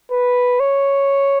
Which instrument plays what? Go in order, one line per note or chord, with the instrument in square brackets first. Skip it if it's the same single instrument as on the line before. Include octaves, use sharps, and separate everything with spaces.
[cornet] B4
C#5